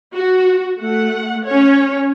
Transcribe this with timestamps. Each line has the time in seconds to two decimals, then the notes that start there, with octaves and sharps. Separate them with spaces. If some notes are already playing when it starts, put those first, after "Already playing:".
0.14 F#4
0.80 A3 F#5
1.46 C#4 C#5